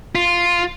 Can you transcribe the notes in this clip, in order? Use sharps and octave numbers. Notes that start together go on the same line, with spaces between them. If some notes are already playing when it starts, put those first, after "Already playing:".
F4